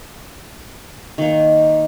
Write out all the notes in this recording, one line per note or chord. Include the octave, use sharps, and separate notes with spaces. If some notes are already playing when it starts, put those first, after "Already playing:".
D#3 A#3